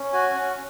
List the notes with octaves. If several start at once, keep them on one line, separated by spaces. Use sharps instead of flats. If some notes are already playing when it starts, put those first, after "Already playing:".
Already playing: C#4
F#4 G#5
C#4